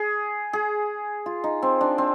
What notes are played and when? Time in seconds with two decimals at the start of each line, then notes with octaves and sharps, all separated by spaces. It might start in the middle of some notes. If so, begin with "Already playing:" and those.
Already playing: G#4
0.53 G#4
1.26 F4
1.44 D#4
1.62 C4
1.81 D4
1.98 C4